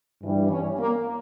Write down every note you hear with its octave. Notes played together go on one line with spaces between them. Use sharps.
G2 E3 G3
C#4
A#3